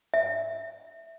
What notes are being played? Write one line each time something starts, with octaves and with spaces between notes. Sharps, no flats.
E5